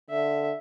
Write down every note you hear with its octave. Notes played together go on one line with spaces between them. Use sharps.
D3 E5